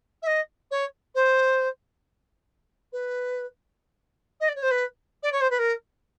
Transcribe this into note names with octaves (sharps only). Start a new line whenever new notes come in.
E5
D#5
C#5
C5
B4
D#5
D5
C#5
C5
B4
D5
C#5
C5
B4
A#4